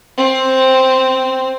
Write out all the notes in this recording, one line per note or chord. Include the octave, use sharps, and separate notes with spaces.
C4